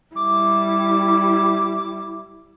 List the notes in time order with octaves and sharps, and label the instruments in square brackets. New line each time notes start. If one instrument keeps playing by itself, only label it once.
[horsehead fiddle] G3 E4 [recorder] D6